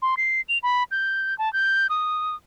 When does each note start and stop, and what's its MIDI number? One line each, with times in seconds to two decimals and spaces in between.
0.02 0.15 84
0.17 0.41 96
0.49 0.58 101
0.63 0.83 83
0.91 1.37 91
1.38 1.51 81
1.53 1.87 91
1.90 2.35 87